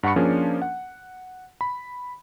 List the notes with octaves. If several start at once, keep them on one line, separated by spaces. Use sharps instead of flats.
G2 F#5 B5 C#6 C#7
F3 A#3 C#4 D4 G#4 A#4
F#5
B5